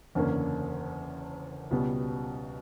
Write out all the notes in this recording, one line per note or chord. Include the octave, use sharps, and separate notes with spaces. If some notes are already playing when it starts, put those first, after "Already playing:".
F#1 E2 D3 A#3 C#4
C#2 B2 G3 B3